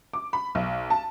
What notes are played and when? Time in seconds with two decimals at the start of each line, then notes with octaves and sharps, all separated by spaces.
0.13 D6
0.33 B5
0.55 B1
0.90 A5